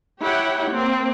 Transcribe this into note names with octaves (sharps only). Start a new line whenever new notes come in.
E4 G4 C#5 F#5 G5
A#3 C4